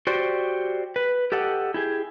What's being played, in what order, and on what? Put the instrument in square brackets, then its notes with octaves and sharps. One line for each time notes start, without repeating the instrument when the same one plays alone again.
[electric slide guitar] F#4 G4 C5 D5
B4
G4 A4 D#5 F#5
E4 G4 G#4